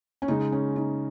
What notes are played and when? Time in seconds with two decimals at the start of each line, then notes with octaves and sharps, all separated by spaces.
0.22 C#4
0.28 C#3 G#3 D#4
0.52 C#4
0.76 D#4